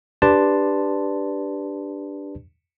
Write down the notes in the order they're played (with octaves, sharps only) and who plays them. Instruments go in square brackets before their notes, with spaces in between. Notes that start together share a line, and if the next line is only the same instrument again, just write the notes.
[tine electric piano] D4 G4 B4 D5 A5 C6